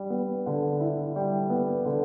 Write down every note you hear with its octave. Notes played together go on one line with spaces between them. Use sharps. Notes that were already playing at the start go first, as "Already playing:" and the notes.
Already playing: G3
B3
D3
E4
G3
B3
D3